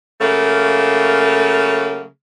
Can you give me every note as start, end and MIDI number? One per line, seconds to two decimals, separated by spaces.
0.20 2.05 49
0.20 2.05 54
0.20 2.05 57
0.20 2.05 58